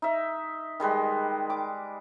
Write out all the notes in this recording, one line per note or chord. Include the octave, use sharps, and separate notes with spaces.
D#4 E5
D#3 G3 G#3 B4
D6